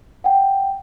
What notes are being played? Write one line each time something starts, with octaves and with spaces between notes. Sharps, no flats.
F#5 G5